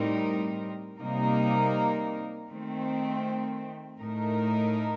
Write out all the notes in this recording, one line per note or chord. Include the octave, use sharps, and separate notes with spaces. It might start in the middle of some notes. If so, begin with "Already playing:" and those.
Already playing: A2 G3 C4 D#4 A#4
C3 G3 A#3 D#4 A#4
D#3 A3 C4
A2 A3 D#4 A#4